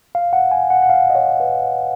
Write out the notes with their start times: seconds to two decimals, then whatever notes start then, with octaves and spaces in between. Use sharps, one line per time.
0.15 F5
0.33 F#5
0.51 G#5
0.70 F#5
0.82 F#5
0.89 F5
1.10 D#5
1.15 C#5
1.40 B4